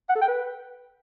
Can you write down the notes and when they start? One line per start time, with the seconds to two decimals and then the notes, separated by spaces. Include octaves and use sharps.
0.09 F#5
0.15 A4
0.22 G5
0.28 B4